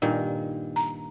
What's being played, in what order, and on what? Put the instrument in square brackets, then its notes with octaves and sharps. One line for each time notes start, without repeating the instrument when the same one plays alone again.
[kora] G2 A#2 D#3
[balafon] A#5